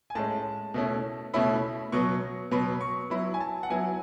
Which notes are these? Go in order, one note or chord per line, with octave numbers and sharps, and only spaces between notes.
G#5
A2 G#3 C#4 A5
B2 A3 C#4 E4
B2 A3 C#4 E4 B5
B2 F#3 B3 C#6
B2 F#3 B3 B5
C#6
F#3 B3 E4 B5
G#5
A5
F#5
F#3 B3 E4 G#5